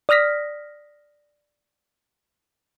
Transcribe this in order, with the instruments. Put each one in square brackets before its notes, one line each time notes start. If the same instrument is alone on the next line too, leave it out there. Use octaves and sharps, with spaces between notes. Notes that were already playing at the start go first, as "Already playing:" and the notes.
[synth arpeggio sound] D5 D#6 F6 A#6 B6